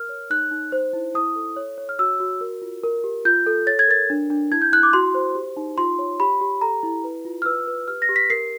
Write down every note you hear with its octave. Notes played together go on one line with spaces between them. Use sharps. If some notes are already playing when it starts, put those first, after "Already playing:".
Already playing: A#4 F6
C#5
D#4 F#6
D#4
C5
E4
E4 D#6
A4
C#5
C#5
F6
F#4 E6
F#4
A#4
F4
A#4
G4
F4 G6
A4
C#5 A6
G#6
A#4 A6
D4
D4
E4 G#6
G6
E4 F#6
D6
F#4 C6
C5
G4
D#4
F4 C6
C#5
G4 B5
G4
A4 A#5
E4
B4
F4
F6
B4 E6
B4
G4 F6
A#6
G4
B6
A#4 C7